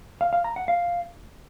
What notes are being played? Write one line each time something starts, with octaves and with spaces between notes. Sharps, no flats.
F5
F5
A#5
F#5
F5